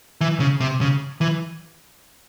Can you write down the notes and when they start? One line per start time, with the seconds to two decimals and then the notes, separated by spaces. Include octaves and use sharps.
0.21 E3
0.40 C#3
0.60 C3
0.81 C#3
1.21 E3